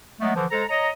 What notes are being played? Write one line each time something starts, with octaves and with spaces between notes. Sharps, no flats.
F#3 G#3 A3 B3
D3 E3 F3
G#3 A4 C5 A#5
C#5 D#5 A#5